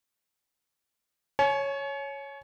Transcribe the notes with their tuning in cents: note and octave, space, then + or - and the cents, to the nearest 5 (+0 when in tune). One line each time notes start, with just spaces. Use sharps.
C#5 +0 G#5 +40